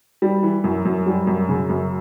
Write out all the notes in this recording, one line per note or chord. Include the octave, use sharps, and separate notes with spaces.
G3
E3
F#2
F#2
G3
F#2
C#3
F#2